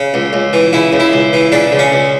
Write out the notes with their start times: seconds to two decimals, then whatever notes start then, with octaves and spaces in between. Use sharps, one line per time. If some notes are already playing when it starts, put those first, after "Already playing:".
Already playing: C#3
0.14 C#2
0.33 C#2
0.53 E3
0.73 C#3 E4
0.93 C#2
1.00 E4
1.13 C#2
1.33 E3
1.52 C#3 D4
1.72 C#2
1.79 C#4
1.92 C#2